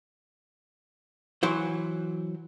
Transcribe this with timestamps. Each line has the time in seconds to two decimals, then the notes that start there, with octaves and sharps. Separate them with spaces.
1.43 E3 F#3 C5